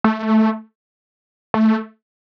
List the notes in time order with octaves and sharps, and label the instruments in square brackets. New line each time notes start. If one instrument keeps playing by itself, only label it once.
[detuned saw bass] A3
A3